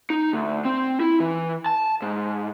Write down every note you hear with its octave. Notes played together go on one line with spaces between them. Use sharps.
D#4
D2
C4
E4
E3
A5
G#2